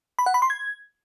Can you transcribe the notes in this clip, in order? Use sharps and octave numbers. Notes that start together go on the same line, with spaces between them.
B5
F#5
B5
C6
G#6